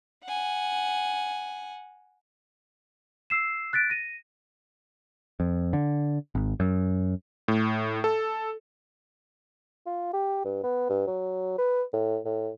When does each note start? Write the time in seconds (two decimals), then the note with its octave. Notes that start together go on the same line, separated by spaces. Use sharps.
0.24 F#5 G#5
3.30 E6 C7 E7
3.73 F#6 A6 B6 D7
3.90 A#6 D#7
5.40 F2
5.73 D3
6.35 G#1
6.60 F#2
7.48 A2
8.04 A4
9.86 F4
10.13 G4
10.45 G2
10.64 B3
10.89 G2
11.07 F#3
11.58 B4
11.93 A2
12.25 A2